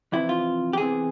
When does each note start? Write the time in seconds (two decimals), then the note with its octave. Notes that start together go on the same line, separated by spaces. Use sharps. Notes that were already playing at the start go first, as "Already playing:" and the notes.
0.12 F2 C3 E3 E4
0.29 F4
0.73 G4
0.77 E2 C3 E3 G#4